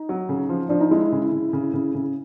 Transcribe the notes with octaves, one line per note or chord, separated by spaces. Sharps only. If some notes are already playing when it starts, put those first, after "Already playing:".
Already playing: D#4
F#3
C#3
F3
F3 D4
D#4
G#3 E4
C#3
C#3
C#3
C#3
C#3